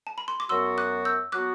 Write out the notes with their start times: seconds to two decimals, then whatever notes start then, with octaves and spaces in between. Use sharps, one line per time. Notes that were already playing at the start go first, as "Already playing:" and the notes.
0.07 A5
0.18 B5
0.28 C6
0.40 D6
0.49 F#2 F#3 B3 F#4 C6 E6
0.78 D6 F#6
1.05 E6 G6
1.32 F#3 B3 F#4 D6 F#6